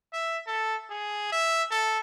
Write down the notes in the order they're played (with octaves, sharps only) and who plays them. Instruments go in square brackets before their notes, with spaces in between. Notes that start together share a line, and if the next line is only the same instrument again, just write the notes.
[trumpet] E5
A4
G#4
E5
A4